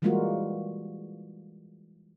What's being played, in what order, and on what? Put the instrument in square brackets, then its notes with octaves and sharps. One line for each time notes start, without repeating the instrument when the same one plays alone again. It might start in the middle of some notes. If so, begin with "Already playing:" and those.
[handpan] E3 G3 G#3 A#3 F4 F#4